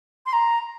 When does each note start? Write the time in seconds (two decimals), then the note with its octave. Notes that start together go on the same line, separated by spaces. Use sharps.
0.26 C6
0.33 A#5